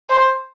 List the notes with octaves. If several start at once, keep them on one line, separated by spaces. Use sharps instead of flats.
C5